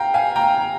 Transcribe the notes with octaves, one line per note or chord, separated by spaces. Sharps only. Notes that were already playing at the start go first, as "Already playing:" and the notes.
Already playing: F5 G5 A#5
F5 G#5
G5 A#5